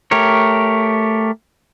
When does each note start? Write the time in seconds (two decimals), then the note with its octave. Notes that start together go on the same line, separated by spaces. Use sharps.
0.11 A3 G4 A#4 C#5